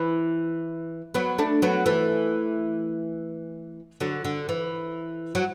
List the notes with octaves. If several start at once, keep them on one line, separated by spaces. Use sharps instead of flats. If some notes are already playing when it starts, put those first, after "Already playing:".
Already playing: E3
F#3 B3
A3 D4
F#3 B3
E3 A3
D3 F#3
D3
E3
F#3